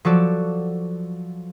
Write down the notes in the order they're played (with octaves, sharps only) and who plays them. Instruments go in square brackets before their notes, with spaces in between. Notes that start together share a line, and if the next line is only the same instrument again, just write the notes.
[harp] F3 F#3 F#4 A4 D5